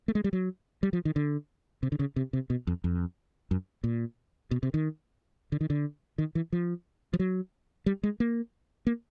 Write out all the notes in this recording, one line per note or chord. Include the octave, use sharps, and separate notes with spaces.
A3
G#3
G3
F#3
G3
F3
D#3
D3
C3
D3
C#3
C3
C3
B2
F2
F2
F#2
A#2
B2
C3
D#3
D3
D#3
D3
D#3
E3
F3
F3
F#3
G3
G#3
A#3
A#3